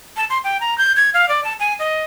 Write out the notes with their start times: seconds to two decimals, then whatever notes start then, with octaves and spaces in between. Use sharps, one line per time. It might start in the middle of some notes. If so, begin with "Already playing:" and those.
0.17 A5
0.30 C6
0.44 G5
0.61 A#5
0.78 G6
0.96 G#6
1.14 F5
1.29 D5
1.44 A5
1.60 G#5
1.79 D#5